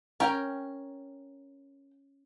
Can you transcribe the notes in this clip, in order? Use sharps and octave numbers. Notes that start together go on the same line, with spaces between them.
C#4 A#4 G5